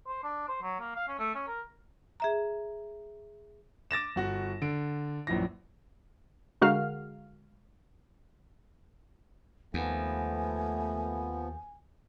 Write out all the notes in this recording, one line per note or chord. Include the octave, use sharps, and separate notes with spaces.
C5
D4
C5
F#3
A#3
F5
C#4
A3
C#4
A#4
G#4 E5 A#5
D6 A6 A#6 E7
G1 F#4 A#6
D3 D7
A#1 F#2 E3 A#6
D3 G#3 F#4 A#4 F5 F6
D#2 F3 A3 B3 G#5